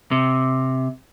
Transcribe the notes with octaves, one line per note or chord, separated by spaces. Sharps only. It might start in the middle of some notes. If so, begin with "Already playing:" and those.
C3